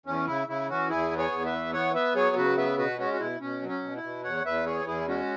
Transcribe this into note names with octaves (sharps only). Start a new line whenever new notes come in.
E2 C#4
C#3 E4
C#3 E4
E3 C#4 F#4
E2 E4 G#4
B3
G#4 C#5
E2
B4 E5
E3
B3 C#5 F#5
B3 B4 E5
F#3 G#4 C#5
C#3 F#4 B4
B3 B4 E5
B2 F#4 B4
G#3 C#4 F#4
F#4
B2 E4
B2 C#4
F#3
C#4
B2
E4
B2
E2 C#5 F#5
E2 B4 E5
E3 G#4 C#5
E2 E4 G#4
G#3 C#4 F#4